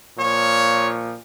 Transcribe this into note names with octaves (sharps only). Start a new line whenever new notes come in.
A#2 F3 C#5